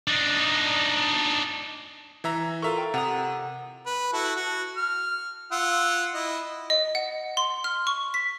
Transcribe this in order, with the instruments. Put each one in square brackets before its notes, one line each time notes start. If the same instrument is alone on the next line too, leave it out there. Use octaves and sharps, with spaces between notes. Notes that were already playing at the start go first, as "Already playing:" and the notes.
[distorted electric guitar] D4 D#4
[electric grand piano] E3 E5 A#5
[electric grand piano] F4 E5 C#6 [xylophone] A4 A#4 A#5
[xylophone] G5 A#5
[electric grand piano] C3 [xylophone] F#5 A#5 D#6
[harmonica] B4
E4 F#4 A4
F#4
F6
F4 F#5 E6
E4 D#5
[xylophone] D#5
F#5
C6
F6
C#6
B6